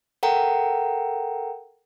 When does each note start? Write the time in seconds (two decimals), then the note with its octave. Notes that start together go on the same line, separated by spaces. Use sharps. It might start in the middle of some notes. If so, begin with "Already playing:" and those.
0.23 A4 A#4 F#5 G5 A#5